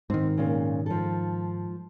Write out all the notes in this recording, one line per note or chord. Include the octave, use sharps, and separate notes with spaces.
G#2 D#3 C4
A#2 C#3
F3 A4